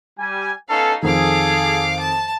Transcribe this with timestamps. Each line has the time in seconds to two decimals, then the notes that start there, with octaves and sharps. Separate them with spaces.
0.20 G3 G#5
0.69 B3 C#4 D#4 A4 F5
1.03 F2 D#3 G#4 A4 F5 D6
1.99 A5